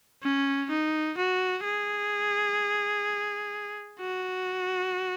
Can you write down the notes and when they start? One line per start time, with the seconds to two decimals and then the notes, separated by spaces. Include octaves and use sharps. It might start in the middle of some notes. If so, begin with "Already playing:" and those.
0.22 C#4
0.70 D#4
1.17 F#4
1.64 G#4
4.00 F#4